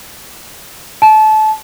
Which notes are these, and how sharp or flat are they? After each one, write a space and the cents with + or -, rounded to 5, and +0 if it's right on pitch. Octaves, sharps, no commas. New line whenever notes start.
A5 -25